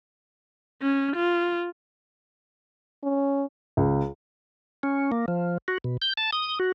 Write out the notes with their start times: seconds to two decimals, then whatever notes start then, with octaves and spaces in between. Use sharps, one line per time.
0.82 C#4
1.16 F4
3.03 C#4
3.77 C#2
4.83 C#4
5.12 A#3
5.28 F3
5.68 F#4
5.84 B2
6.02 G6
6.17 A5
6.32 D#6
6.60 F#4